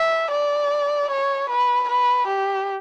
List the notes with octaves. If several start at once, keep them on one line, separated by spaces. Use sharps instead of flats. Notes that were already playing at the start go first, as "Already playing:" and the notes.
Already playing: E5
D5
C#5
B4
B4
G4